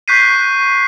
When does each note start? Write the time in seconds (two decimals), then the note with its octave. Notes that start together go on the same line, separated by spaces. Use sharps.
0.08 C#6 F#6 G6 B6 C7 D#7